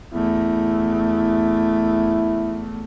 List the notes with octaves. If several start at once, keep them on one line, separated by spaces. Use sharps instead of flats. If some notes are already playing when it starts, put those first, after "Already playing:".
E2 A3 E4